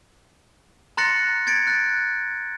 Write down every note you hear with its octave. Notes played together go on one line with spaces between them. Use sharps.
A#5 C6 F#6 A6 A#6 C#7
G#6 A6 C#7 D7
F#6 A6